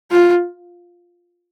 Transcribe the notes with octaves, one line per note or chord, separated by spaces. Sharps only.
F4